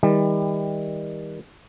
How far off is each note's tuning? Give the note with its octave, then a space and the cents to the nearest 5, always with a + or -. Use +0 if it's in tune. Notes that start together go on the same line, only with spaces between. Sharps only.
D#3 +35 G3 +30